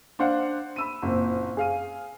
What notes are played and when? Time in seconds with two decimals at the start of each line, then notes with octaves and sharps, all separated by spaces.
0.19 D4 C5 F5 F#5
0.76 B5 E6 D#7
1.02 F#1 A#2 C4
1.57 G#4 F5 D#7